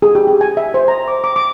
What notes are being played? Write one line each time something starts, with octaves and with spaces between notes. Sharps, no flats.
G#4
G4
G4
G#5
E5
C5
A#5
D6
D6
D6